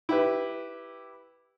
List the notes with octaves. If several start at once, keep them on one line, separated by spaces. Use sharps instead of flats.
E4 G4 B4